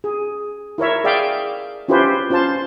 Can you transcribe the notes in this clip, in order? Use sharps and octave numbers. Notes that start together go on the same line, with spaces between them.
G#4
E4 A#4 C#5 E5
G#4 D5 E5 F5 G5
C#4 E4 F4 G4 B4 C5
C#4 F4 C5 A5